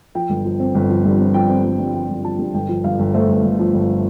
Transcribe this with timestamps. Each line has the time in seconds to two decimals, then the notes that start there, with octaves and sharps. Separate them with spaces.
0.15 F3 G5
0.30 G1
0.45 F3
0.60 C4
0.75 G1
0.90 F3
1.05 G2
1.19 C4
1.34 F3 G5
1.49 C4
1.65 G1
1.79 G2
1.94 F3 G5
2.09 G1
2.24 F3 A5
2.39 G2
2.54 G1 G5
2.69 F3
2.84 G1 F5
2.99 G1
3.14 A3 C5
3.29 G1
3.44 G1
3.59 F3
3.74 G1